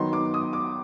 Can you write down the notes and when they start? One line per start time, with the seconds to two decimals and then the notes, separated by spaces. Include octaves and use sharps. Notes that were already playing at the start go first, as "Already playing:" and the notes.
Already playing: D#3 F#3 B3 D#4 C6
0.13 D6
0.34 D#6
0.53 D6